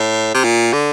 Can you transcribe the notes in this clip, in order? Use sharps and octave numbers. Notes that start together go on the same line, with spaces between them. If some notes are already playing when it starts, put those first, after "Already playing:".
Already playing: A2
C3
A#2
D3